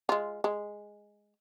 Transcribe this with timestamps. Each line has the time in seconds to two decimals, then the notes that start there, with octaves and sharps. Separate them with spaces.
0.09 G#3 F4
0.44 G#3